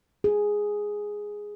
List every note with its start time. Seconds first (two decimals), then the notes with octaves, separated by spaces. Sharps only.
0.24 G#4